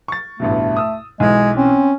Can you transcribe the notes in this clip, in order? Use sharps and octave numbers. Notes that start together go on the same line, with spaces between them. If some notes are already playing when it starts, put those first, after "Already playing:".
C#6 A6
A1 G2 B2 A3
D#6 E6
B1 E3 G#3
C4 C#4